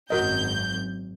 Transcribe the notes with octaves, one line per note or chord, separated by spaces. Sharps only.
G#1 F#2 F#4 A#4 D#5 G6